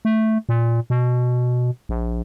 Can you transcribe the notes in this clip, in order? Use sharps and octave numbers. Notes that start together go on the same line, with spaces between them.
A3
A#2
B2
A#1